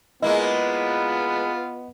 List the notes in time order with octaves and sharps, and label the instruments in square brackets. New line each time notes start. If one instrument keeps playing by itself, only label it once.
[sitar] G#3 A#3 E4 [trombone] B3 [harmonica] F4 B4 [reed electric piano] D#5